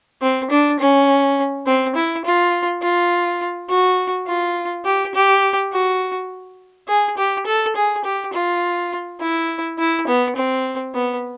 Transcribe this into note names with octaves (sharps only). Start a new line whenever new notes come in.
C4
D4
C#4
C4
E4
F4
F4
F#4
F4
G4
G4
F#4
G#4
G4
A4
G#4
G4
F4
E4
E4
B3
C4
B3